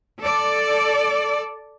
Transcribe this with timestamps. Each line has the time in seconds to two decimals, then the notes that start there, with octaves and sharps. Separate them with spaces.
0.21 A4 D5